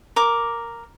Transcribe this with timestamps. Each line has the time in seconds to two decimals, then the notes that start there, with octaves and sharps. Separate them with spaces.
0.16 A#4 D6